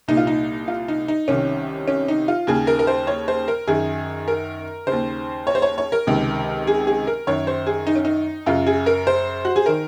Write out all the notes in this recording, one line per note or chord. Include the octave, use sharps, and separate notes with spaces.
C2 A#2 D#4
F4
D#4
F4
D#4
D#4
C2 C3 D#3 C#4
C#4
D#4
F4
D#2 C#3 G#4
A#4
A#4
C5
C#5
C5
A#4
F#2 D#3 G#4
A#4
D#2 C#3 C5
C#5
C5
C#5
C#5
A#4
C#2 C3 D#3
G#4
G#4
A#4
F#2 D#3 C#5
C5
G#4
D#4
C#4
D#4
F#2 C#3 F4
G#4
A#4
C5
F#4
G#4
D#3 A#4